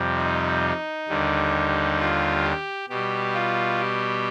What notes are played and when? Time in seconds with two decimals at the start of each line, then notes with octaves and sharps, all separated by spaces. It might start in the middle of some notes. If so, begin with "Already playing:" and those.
Already playing: F2 C3 G3
0.18 D#4
1.08 D#2 D3 G3
1.99 F4
2.44 G4
2.89 B2 G3 G4
3.34 F4
3.80 G4